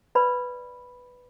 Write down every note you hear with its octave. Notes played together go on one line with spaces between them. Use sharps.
B4 D5 B5